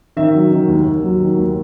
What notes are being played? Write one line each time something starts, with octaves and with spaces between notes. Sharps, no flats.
D#3 E5
F#3
D#3
D#2
D#2
F#3
D#3
D#2